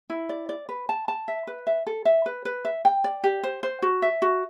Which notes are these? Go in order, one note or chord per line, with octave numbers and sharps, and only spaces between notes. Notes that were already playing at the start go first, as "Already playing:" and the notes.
E4
D5
D5
B4
A5
A5
E5
B4
E5
A4
E5
B4
B4
E5
G5
D5
G4
C5
C5
F#4
E5
F#4